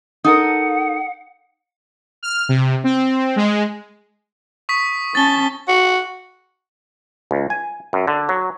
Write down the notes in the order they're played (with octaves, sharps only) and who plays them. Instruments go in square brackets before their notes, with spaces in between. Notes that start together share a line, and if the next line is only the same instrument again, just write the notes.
[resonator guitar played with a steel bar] D#4 A4 A#4 [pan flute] F#5
[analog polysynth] F6
C3
C4
G#3
[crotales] C#6 D#6 B6
[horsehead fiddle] C#4 A5 [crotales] A6 G7
[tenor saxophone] F#4
[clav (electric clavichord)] C#2
G#5
F#2
D3
F#3